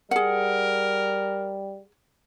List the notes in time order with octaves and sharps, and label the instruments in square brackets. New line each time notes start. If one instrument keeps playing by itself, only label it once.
[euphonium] G3 [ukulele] G#4 F#5 [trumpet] A#4